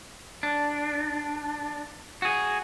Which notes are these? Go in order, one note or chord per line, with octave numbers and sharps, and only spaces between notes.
D4
F#4 G#4